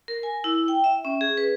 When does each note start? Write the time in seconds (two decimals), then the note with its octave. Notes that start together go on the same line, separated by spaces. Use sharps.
0.08 A#4
0.23 G#5
0.44 E4
0.68 G5
0.84 E5
1.05 C#4
1.21 G#4
1.37 B4